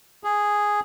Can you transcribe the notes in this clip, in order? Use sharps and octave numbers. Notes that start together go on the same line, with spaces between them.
G#4